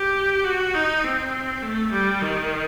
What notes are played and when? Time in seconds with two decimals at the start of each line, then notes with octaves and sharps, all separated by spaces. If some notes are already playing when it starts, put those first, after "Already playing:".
Already playing: G4
0.45 F#4
0.74 D#4
1.04 C4
1.62 A3
1.92 G3
2.21 D#3